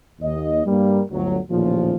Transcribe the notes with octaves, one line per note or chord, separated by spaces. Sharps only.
D#2 D#5
G2 G3 A#3
G1 D2 F#3
A1 D#2 A#2 C#3 F3